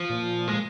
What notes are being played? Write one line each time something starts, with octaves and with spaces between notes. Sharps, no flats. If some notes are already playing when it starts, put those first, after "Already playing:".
Already playing: F3
A#2
G#3
A#3